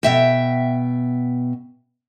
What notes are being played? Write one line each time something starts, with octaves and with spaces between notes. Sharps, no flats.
B2 E5 G5